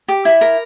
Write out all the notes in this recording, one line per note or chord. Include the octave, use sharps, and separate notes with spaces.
G4
E4
A#4